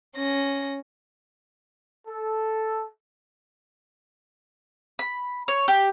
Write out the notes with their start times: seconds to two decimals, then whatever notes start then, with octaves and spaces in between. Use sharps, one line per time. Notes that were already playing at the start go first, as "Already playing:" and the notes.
0.16 C#4 A#6
2.07 A4
4.99 B5
5.48 C#5
5.68 G4